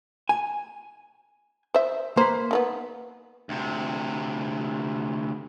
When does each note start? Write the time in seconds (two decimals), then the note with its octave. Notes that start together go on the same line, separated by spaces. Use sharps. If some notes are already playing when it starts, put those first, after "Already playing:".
0.29 G#5
1.74 C5 E5
2.17 A#3 B4 C5
2.51 D#3 A3 B3
3.49 D2 C3